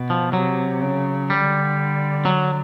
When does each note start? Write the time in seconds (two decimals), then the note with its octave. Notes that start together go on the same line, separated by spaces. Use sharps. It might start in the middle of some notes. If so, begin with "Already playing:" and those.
Already playing: B2
0.10 F3
0.33 C3 F#3
0.82 C#3
1.29 D3 G3
2.25 F#3